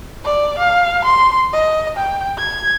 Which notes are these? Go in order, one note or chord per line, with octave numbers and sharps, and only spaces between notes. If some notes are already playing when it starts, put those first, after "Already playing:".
D5
F5
C6
D#5
G5
G#6